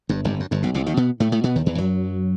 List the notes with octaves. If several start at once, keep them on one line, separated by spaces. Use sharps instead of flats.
G1 G2
G1 G2
F#2
G1 G2
B1 B2
C2 C3
D#2 D#3
B2 B3
A2 A3
A2 A3
B2 B3
D#2 D#3
E2 E3
F#2 F#3